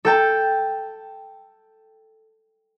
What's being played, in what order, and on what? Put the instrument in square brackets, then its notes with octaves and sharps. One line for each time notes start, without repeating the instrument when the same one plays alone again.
[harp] A4 G5 A5